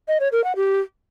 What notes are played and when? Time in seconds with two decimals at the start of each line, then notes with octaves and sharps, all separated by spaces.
0.08 D#5
0.20 C#5
0.32 A#4
0.44 F#5
0.56 G4